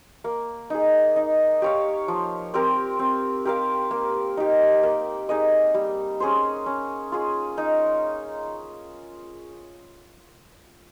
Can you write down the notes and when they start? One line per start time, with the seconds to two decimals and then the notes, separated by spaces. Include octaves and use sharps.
0.24 A#3
0.70 D#4 G#4
1.16 D#4
1.62 G4 C#5 F5
2.08 F3
2.54 C4 G4 A#4
2.99 C4
3.45 G4 A#4 F5
3.91 A#3
4.37 D#4 G4
4.83 A#3
5.29 D#4 G#4 D#5
5.74 G3
6.20 C#4 G#4 C5
6.66 C#4
7.12 F4 G#4
7.58 D#4